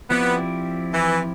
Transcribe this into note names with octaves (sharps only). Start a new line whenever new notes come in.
F3 B3 C4 E4 G4 D5
E3